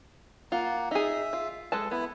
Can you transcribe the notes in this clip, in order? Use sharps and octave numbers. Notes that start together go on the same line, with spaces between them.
A#3 F4 F#5
D#4 G#4 E5
F4
G#3 A4 B4 A5
B3 E4